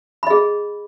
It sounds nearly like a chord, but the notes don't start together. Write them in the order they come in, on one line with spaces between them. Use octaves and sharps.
B5 D#5 G#4